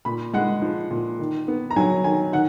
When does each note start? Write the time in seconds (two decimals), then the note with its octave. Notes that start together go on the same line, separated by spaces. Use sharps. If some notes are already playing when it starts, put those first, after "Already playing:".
0.05 A#2 B5
0.33 G#3 F#5
0.62 F3
0.91 A#2
1.19 D#3
1.48 B3
1.71 A#5
1.76 F#3 G#5
2.04 D#3 G#5
2.33 D#3 F#5